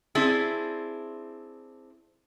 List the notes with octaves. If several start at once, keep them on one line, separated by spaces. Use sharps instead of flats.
C4 D4 E4 G#4